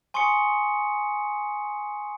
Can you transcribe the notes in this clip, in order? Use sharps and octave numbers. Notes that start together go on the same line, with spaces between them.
G#5 C6 C#6 D#6 C#7